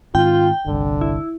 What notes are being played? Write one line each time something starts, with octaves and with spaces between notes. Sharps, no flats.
G#2 D#3 C4 F4 G5
G1 C2 D3
E4